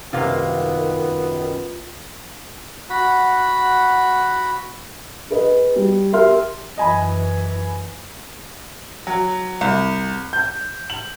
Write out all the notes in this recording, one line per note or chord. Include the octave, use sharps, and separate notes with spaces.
C2 F#2 C3 D#3 A#3 B3 F4
F#4 F#5 B5
G#4 B4 D#5
G3
G4 A#4 E5 C6 F6
F#2 E3 D#5 G#5 B5
F#3
C2
G6
F#7